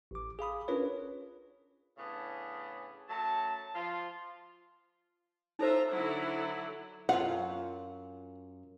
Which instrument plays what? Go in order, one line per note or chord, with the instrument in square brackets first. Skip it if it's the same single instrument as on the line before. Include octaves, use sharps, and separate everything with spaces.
[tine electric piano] A1 D6
G#4 F5 B5 D#6
C#4 D4 F4 A#4 B4 C#5
[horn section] A2 C#3 B3 D4 G#4
F#2 F#3 A3 A5
F3 F4
[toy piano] D#4 A4 C5 [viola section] F4 E5 A#5
[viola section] D3 F#3 E4
[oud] F#2 F4 [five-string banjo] F#5